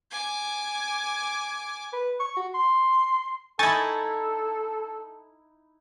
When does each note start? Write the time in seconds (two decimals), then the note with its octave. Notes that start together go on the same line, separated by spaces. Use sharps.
0.11 G#5 D6
1.93 B4
2.20 C#6
2.37 F#4
2.54 C6
3.59 D#4 E4 A4 G#5 C#6 A6